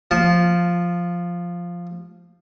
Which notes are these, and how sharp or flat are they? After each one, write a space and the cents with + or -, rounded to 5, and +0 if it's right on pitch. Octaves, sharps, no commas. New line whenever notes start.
F3 +0 A5 -25